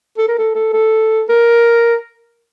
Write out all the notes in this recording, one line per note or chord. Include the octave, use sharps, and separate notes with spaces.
A4
A#4
A4
A4
A4
A#4